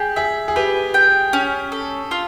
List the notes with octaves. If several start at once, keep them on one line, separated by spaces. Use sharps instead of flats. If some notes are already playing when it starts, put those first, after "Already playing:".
Already playing: G4 G#4
G#4 E5
G#4
G4 B4
G5
C#4
A4
F4